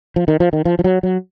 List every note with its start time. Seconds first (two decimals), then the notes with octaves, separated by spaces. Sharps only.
0.16 F3
0.28 D#3
0.40 F3
0.53 D#3
0.65 F3
0.79 F3
0.84 F#3
1.03 F#3